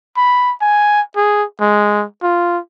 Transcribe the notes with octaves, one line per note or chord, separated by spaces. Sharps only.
B5
G#5
G#4
G#3
F4